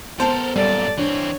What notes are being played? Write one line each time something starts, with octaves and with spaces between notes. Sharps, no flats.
B3 A4 A#4 C5 A5
F#2 A#2 G3 A4 D5
E3 C4 D4 C#5